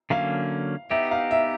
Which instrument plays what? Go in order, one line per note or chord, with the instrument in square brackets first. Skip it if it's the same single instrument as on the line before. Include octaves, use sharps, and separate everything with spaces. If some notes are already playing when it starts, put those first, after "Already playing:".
[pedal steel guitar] D3 F#3 A#3 C#4 [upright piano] F5
[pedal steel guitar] B3 D#4 G4 [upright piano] E5
[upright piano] F5
E5